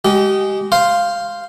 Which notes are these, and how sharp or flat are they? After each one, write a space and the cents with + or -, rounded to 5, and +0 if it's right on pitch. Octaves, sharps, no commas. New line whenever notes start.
G#3 -10 G4 -30
C5 +0 F5 -5 C6 +0